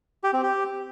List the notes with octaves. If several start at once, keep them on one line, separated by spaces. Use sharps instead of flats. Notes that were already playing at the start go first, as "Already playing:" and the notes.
G4
C4
G4